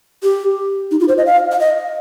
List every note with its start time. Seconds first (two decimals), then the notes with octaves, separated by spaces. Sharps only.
0.23 G4
0.91 D#4
1.00 F4
1.08 C5
1.18 D#5
1.26 F5
1.52 F5
1.60 D#5